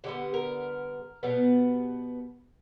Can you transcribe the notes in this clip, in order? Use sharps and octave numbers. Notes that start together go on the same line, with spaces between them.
D3 G3 B3 G4
A#4
B2 G3 B3